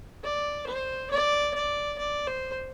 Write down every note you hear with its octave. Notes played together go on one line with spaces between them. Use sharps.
D5
C5
D5
D5
D5
C5